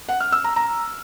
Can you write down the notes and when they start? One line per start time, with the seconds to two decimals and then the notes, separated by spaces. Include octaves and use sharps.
0.09 F#5
0.20 F6
0.32 E6
0.44 A#5
0.56 A#5